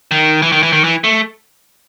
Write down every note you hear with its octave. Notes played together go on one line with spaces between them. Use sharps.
D#3
E3
D#3
E3
D#3
E3
A3